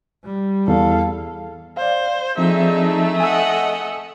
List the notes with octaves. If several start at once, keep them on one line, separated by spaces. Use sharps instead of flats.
G3
E2 A4 F5
C5 D5 F5
F3 A3 C4 D4 D#4 G#4 E5
D#5 F#5 G#5 D#6 E6